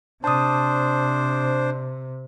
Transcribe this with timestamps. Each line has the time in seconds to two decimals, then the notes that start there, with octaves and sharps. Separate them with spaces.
0.24 C3 D4 C5 A5 D#6